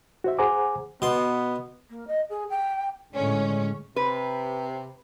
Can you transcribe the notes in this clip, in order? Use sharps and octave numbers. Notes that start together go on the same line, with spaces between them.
F#4 C5 E5
G#4 C5 F#5 G#5 A#5 D6
B2 B3 C6
A#3
D#5
G#4
G5
A2 D3 G#3 C#4
C3 B4